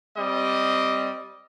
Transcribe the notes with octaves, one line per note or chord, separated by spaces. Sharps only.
G3 C4 D#5